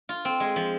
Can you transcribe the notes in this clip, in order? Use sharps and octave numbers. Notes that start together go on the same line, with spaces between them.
F4
C4
G#3
F3